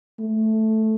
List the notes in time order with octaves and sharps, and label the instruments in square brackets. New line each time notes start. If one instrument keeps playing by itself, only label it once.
[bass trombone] A3